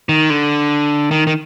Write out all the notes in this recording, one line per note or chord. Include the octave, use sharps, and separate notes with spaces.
D#3
D3
D#3
D#3